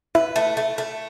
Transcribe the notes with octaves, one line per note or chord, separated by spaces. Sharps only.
E4 B4
A3
A3
A3